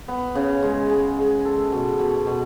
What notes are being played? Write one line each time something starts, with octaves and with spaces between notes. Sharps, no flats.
B3
C#3
G#3
G#3
G#3
A4
B2
B2
B2